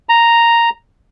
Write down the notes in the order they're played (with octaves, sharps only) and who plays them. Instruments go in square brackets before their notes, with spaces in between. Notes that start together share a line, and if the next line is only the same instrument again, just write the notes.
[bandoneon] A#5